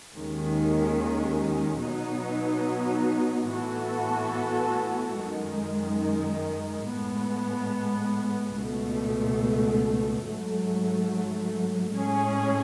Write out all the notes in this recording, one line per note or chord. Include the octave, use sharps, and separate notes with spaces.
D#2 D#3 G#3 C#4
B2 F#3 B3 D#4
A2 E3 B3 F#4 A4
F#2 D#3 G#3
A2 G#3 B3
C#2 B2 A3
G#2 F#3 A3
A2 G#3 C#4 G#4